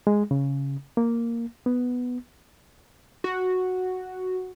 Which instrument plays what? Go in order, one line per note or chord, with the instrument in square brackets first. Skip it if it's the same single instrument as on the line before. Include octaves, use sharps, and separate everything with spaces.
[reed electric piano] G#3
C#3
A#3
B3
[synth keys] F#4